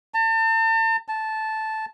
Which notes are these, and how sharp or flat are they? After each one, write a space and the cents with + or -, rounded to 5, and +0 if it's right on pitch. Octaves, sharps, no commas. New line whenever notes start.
A5 +40
A5 -10